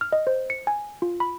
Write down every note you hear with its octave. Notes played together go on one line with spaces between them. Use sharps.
F6
D#5
C5
C#7
G#5
F4
B5